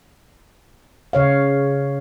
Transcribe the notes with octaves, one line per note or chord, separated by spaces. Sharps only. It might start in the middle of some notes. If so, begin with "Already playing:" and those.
C#3 C#5 F5